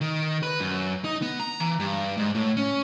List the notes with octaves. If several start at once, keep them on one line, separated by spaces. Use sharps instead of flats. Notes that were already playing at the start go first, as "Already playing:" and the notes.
D#3
B4
F#2
D#4
B3
A#5
E3
G2
G#2
A2
C#4